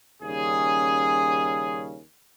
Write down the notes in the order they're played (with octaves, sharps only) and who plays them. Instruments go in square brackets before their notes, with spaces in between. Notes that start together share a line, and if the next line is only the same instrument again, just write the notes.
[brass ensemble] D#2 C#3 G3 C#4 G#4